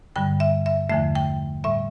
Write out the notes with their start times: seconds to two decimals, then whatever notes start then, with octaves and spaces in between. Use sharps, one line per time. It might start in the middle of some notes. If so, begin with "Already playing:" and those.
0.16 G2 D3 G3 G5
0.40 E5
0.66 E5
0.90 E2 D3 F3 A3 E5
1.15 G5
1.64 A2 G3 E5